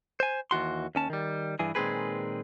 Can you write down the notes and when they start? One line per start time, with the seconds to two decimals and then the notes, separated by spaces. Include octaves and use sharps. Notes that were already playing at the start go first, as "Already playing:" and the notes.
0.20 C5 G#5
0.51 D#2 E3 F#4 C6
0.95 D#2 C#4 A5
1.10 D#3 G3
1.59 G2 E3 G#4
1.75 A#2 D#3 G#3 C4 G#4 B4